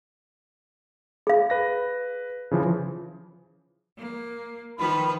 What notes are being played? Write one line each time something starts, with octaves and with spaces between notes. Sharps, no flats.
G#4 F5
B4 A#6
C#3 E3 F3
A#3
D#3 F3 B4 B5